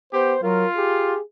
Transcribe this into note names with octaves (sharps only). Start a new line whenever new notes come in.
B3 G4 C5
F#3 F4 A#4
G4 G#4